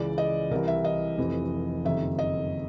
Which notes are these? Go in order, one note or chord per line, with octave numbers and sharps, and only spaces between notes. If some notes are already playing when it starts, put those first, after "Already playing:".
Already playing: C#2 C#3 E3 D5
D#5
C2 C3 E3 A#4
E5
D#5
F1 F2 C3 E3
F#1 F2 C3 D#3 E5
D#5